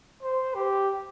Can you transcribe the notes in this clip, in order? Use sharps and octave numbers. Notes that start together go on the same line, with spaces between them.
C5
G4